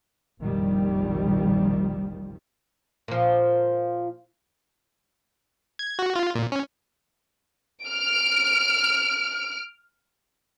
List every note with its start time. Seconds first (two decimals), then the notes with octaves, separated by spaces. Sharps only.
0.39 F1 A#1 D#3 F3 G3
3.08 A#2 F3
5.79 G#6
5.99 F#4
6.16 F4
6.35 A#2
6.52 C#4
7.84 F6 D7